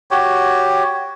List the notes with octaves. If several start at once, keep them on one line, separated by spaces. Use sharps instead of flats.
F#4 G4 C#5